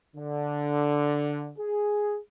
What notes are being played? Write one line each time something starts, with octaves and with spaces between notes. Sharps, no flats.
D3
G#4